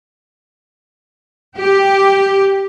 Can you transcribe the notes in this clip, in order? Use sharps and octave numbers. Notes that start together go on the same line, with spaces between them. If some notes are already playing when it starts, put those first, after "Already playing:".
G4